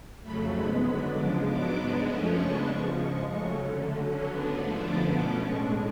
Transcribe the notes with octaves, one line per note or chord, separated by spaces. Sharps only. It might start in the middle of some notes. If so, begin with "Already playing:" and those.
F2 C#3 F#3 A3 B5
G#2 G#3 B3 B5
D3 F#3 B3 D4 B5
C#3 F3 G#3 D6
G#2 F#3 B3 D4 D6
G#2 G#3 B3 D4
F#2 F3 A3 C#4
C#3 G#3 B3 D4 C#6
F#2 C#3 F3 C#6
G#2 F3 G#3 C#6
C#3 F#3 A3 C#4 C#6
D3 F#3 A3
D3 F#3 C#4
D3 F#3 B3 D4
G#2 F3 A3 D4
F#2 D3 F3 B3 D4 D6
B2 A3 C#4 D6
A2 G#3 D4 C#6